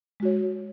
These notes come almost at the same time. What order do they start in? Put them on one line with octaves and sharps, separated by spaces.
G#3 F#4 C#5